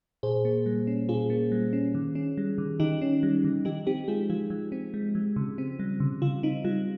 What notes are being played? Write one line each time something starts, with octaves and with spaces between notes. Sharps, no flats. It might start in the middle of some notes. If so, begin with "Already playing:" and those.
A#2 G#4 C5
A#3
G3
C#4
A#2 F4 G#4
A#3
G3
C#4
D#3
C#4
G3
D#3
D#3 D#4 G4
C#4
G3
D#3
F3 D#4 G4
C4 D#4 G4
G#3 F4 G#4
F3 F4
F3
C4
G#3
F3
C#3
C4
G3
C#3
C#3 F4
C4 D#4
G3 F4